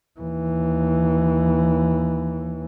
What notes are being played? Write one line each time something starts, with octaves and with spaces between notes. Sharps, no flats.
D#2 E3